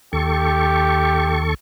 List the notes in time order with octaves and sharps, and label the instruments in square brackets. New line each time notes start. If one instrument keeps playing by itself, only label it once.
[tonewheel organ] D#2 A4 C#6 [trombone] G4